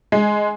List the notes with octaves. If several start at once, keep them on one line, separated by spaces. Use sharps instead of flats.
G#3